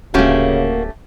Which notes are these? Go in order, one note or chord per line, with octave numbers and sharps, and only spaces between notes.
D1 C#3 A3 A#3 C#4 F#4 G4